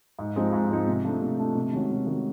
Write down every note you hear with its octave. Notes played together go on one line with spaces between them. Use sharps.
G#2
F3 G#3 C4 D#4
G#2
F3 G#3 C4 D#4
C3
F3 A3 D4
C3
F3 A3 D4
C3
D#3 G#3 C#4 F#4
C3
D#3 G#3 C#4 F#4